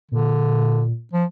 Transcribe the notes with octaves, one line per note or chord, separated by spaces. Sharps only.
A#2 D3
F3